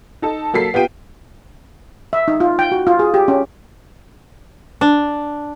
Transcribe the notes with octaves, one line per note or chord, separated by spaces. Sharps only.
D#4 A4 A5
F#3 A#3 A4 A5 B6 C7
B3 F4 G4 G5 D#7
E5
D#4
F4
G5
F#4
F4
G#4
G4
C#4
D4